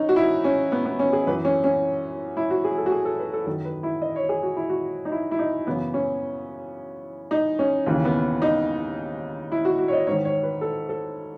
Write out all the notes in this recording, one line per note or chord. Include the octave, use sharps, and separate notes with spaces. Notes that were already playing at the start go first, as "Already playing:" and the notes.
Already playing: C#4 D#4
F#4
E4
C#4
B3
B3
C#4
G#4
F#2 E3 B4
C#4
C#4
E4
F#4
G#4
A4
F#4
G#4
A4
B4
A4
F#2 D#3 A4
B4
E4
D#5
C#5
G#4
F#4
E4
F#4
D#4
E4
E4
D#4
F#2 C#3 E3 B3
C#4
D#4
C#4
D#2 C#3 E3
B3
D#4
E4
F#4
F#4
C#5
D#5
G#2 D#3 C#5
C#5
B4
A4
A4